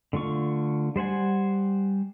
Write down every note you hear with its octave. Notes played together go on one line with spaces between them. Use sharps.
D3 A3 F4 C#6
G3 C5 F#5 G#5